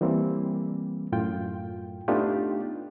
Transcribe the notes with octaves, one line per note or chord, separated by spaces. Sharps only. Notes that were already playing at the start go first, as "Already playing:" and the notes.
E3 G3 A#3 C4
F#2 A2 F4 G5
A3 B3 D4 D#4 F4 G4